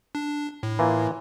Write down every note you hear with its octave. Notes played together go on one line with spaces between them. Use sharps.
D4
A2
E3 A#3 F4